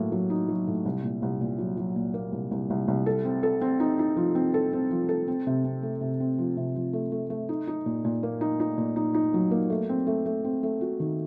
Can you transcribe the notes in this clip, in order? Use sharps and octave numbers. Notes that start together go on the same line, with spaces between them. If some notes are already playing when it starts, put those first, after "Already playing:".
Already playing: A2 F#3 A#3
F#3
D#4
F#3
A2
C2
A#2
C2
A#2
F#3
F#3
A#2
A#3
C2
C2
C2
C2
A4
C4
A4
C4
D#4
D#4
F3
C4
A4
C4
F3
A4
C4
C3
C4
A3
C3
C4
F3
C3
F3
A3
A3
A3
D#4
D#4
A#2
A#2
A#3
D#4
D#4
A#2
D#4
D#4
F#3
A#3
A3
C4
A3
A3
C4
A3
F#4
D#3